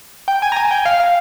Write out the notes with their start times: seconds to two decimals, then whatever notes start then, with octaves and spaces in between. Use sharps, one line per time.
0.28 G5
0.42 G#5
0.52 A#5
0.56 G#5
0.71 G5
0.85 F5
1.00 F5